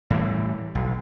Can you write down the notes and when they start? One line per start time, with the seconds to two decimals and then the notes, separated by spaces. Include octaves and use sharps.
0.10 A2 E3 G3
0.75 B1